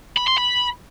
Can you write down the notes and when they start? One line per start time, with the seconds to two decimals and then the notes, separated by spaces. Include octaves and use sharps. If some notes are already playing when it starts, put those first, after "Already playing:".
0.18 B5
0.28 C6
0.38 B5